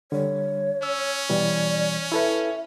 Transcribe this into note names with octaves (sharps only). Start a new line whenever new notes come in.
D3 G3 C#5
C#4 E6
B2 E3 G3 D5
E4 A4 B4 E5